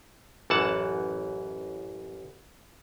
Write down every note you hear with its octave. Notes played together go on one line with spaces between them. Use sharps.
A1 F#2 E3 F#5 A5